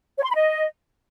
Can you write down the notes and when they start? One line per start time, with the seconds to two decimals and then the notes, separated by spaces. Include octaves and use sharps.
0.17 C#5
0.23 C6
0.29 B5
0.35 D#5